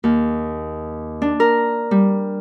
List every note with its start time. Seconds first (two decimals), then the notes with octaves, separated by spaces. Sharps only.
0.04 D#2
1.22 D4
1.40 A#4
1.91 G3